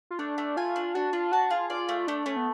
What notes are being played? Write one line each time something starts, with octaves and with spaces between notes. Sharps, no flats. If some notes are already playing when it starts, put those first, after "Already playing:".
F4
A3 D4
A3
F4 G#5
D4
D4 F#4
D4 F4
F#4 A5
F4 G#4
F4 D5
A3
A3 D4
A3 C#4
B3